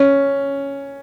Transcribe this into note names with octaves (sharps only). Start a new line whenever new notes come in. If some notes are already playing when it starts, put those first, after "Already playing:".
Already playing: C#4